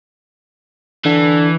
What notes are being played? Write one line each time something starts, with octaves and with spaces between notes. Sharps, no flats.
D3 E3